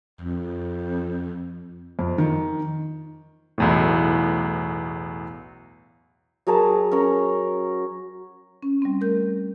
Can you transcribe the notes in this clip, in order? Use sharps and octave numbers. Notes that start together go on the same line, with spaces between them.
F2
F2
D#3
B1 E2 A2
F#3 G#4 A#4 A5
C#4 A#4
C#4
G3 C4
A3 A#4 G6